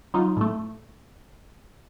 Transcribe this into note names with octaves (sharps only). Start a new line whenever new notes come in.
F#3 D#4 F4
A2 A3